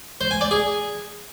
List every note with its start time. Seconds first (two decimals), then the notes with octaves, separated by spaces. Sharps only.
0.21 C5
0.31 G#5
0.41 D5
0.51 G#4